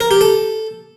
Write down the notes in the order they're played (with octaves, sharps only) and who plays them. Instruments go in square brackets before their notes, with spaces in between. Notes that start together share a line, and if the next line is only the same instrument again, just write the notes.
[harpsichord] A#4
G4
A4